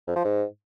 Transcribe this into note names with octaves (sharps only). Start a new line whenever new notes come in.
F2
F3
G#2